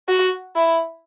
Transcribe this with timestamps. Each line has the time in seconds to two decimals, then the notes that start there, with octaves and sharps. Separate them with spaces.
0.08 F#4
0.56 E4